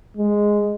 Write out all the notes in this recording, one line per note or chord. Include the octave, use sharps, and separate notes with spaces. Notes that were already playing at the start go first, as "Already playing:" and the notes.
G#3